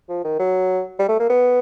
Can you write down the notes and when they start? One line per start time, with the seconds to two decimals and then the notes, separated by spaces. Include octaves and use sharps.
0.09 F3
0.25 D#3
0.39 F#3
0.99 G3
1.09 A3
1.20 A#3
1.30 B3